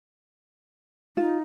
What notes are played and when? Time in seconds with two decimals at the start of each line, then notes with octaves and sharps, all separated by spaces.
1.17 D#4 F4